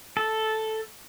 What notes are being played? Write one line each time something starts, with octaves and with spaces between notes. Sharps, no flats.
A4